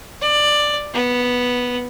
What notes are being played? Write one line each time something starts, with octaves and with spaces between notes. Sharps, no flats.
D5
B3